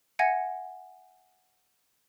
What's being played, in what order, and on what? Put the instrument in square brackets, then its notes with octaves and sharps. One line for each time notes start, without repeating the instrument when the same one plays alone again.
[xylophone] E5 F#5 G#5 G#6 A#6 C#7